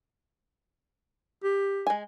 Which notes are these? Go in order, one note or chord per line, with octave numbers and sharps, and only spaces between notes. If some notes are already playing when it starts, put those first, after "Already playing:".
G4
G#3 G#5